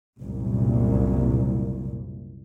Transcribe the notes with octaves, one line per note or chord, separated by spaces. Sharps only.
F#1 C2 A#2